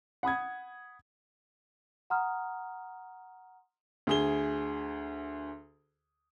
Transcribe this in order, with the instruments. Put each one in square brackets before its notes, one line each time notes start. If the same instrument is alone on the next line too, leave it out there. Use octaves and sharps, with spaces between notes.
[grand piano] F#5 B5 D#6 G#6
[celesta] F#5 A#5 C6 D#6 F6
[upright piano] D2 G#4 G7